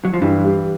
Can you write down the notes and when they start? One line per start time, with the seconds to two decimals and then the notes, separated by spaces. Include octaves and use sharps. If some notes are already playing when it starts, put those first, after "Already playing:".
0.05 F#3
0.14 F3
0.21 G2 E3
0.44 G3